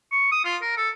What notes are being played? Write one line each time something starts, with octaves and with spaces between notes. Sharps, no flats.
C#6
D#6
F4
A#4
A4